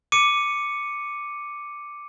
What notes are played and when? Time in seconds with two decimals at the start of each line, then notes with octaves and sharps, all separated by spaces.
0.12 D6 C#7 D#7